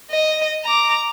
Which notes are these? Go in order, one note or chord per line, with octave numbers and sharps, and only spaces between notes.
D#5
A#5 D6